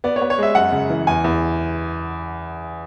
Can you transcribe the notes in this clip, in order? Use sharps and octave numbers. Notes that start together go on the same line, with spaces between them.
B3 D5
C#5
B3
C#5
G#3 E5
F#2 F#5
C#3
E3
E2 G#5
E2